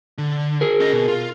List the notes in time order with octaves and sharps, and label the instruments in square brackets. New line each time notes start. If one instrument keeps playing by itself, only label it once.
[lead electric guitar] D3
[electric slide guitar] G#4 A#4
[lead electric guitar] C#4 D#5
B2
F4